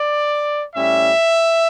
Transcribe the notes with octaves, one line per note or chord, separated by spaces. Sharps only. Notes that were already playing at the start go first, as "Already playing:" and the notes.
Already playing: D5
A2 G3 C#4 E5